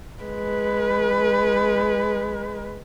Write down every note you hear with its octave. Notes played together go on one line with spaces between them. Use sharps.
G#3 B4